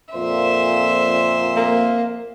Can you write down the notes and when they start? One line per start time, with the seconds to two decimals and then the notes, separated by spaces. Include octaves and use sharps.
0.15 F2 A#2 C5 E5
1.56 A#3